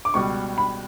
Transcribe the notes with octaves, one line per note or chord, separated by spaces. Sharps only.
D6
C#2 B2 G3 C#6
B5